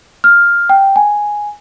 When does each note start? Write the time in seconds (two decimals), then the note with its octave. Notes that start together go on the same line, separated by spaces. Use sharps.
0.24 F6
0.70 G5
0.96 G#5